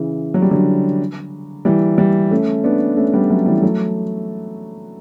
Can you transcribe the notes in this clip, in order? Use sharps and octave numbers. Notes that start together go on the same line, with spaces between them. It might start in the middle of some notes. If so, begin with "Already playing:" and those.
Already playing: C#3 E3
F#3
G3
D3 F#3
E3 G3
E3 G3
A3 C#4
B3 D4
A3 C#4
G3 B3
F#3 A3
E3 G3
F#3 A3